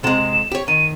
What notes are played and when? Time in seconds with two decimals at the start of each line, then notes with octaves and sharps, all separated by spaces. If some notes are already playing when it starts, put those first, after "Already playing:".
0.04 C3 G#3 E7
0.52 G4 C#5
0.68 D#3 D#7